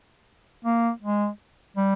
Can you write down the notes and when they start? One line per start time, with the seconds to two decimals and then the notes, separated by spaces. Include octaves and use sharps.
0.65 A#3
1.02 G#3
1.77 G3